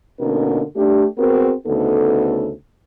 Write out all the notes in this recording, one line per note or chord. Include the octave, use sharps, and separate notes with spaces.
B2 D3 A#3 C#4 D#4 A#4
A3 D4 G4
B3 C4 F#4 G#4 A#4
D2 C#3 B3 D#4 A4